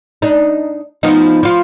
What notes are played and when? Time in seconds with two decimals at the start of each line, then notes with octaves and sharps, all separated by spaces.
0.22 D4 D#4
1.03 F3 B3 D#4
1.43 F3 F4